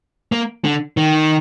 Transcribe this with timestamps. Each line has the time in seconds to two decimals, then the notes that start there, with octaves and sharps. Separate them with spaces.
0.32 A#3
0.64 D3
0.97 D#3